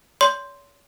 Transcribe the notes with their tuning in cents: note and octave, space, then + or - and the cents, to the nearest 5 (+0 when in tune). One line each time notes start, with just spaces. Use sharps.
C#5 +40 C6 +0